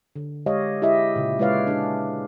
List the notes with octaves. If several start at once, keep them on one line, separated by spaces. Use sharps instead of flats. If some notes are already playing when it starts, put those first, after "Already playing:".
D3
G#3 G4 C#5 D#5 F5
E4 G4 G#4 D#5 E5
A#2 C#3
G#3 E4 B4 C#5 D5 F5
D4 G#4